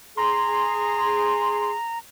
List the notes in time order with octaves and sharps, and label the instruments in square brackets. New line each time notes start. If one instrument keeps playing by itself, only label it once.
[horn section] G#4 [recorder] A#5 [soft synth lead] C6